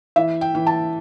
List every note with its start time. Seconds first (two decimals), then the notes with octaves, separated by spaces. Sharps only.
0.16 E3 E5
0.41 G5
0.55 E3
0.67 A5